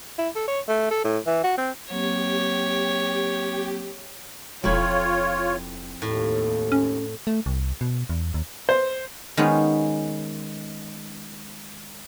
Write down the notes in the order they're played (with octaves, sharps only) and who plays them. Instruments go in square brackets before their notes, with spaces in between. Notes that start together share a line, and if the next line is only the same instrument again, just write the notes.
[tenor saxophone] E4
A4
C#5
A3
A4
A2
E3
F#4
C4
[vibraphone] F#3 A#3 C4 [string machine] G4 [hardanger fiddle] C#5
[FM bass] E1 [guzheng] F2 E4 [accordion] F4 C#5
[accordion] D#2 [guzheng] A2
[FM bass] C#4
A3
C2
B2
E2
D#2
[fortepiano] C5
[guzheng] D#3 G#3 B3 C#4 C5